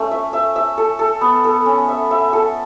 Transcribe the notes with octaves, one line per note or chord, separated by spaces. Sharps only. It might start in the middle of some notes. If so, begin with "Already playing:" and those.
Already playing: A3 C#4
E5
E5
E5
A4
A4
B3
A4
C#4
E5
E5
A4